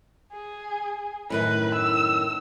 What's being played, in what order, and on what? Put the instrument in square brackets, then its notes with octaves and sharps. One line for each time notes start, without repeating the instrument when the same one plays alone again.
[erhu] G#4
[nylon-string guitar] F#2 A2 D#3 [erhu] B4
[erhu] E6